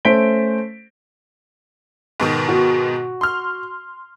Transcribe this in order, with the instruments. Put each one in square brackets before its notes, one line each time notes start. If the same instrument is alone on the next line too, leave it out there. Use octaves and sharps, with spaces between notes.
[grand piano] A3 C#4 C5 B6 D7 G7
[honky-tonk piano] G#2 B2 D#3
[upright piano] F#4
[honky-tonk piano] C6 F6